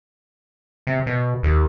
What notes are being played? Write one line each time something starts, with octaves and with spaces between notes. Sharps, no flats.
C3
B2
D#2